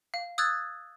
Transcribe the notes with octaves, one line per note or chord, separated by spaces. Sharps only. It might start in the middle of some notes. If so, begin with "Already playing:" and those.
F5
D#6 E6 F#6 G#6 A6